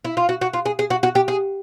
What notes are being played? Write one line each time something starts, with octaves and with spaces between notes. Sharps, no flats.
E4
F4
F#4
F#4
F4
G#4
G#4
F#4
F#4
G4
G#4